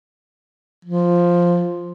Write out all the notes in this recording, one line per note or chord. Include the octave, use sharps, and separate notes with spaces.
F3